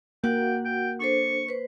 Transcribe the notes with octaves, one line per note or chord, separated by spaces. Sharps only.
A#3 F#4 F#5 G5
G5
D4 A4 C5 C#6
B4 C5